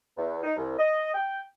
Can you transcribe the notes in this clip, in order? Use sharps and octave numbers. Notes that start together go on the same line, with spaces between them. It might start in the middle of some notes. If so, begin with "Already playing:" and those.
E2
D#4
C2
D#5
G5